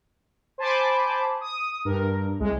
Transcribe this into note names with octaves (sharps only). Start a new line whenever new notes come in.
C5 G#5 A5 B5 C6 D6
D#6
G2 A#4
C2 G#3